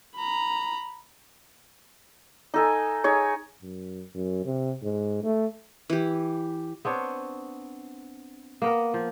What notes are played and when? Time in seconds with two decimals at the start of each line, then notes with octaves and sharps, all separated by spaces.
0.16 A#5 B5
2.54 D#4 A4 G#5
3.04 D#4 G#4 C#5
3.62 F#2
4.15 F#2
4.45 C3
4.83 G#2
5.24 A3
5.90 E3 G4
6.85 B3 C4 D4 C#5
8.62 A#3 B3 A#4
8.94 F3